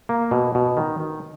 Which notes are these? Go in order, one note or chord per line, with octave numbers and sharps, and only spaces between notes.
A#3
B2
B2
D#3
D#3